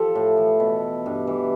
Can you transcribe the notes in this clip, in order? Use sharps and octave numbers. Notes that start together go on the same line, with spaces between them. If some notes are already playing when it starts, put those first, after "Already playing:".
Already playing: F3 G4 A4
A2
E3
B2
G2
E3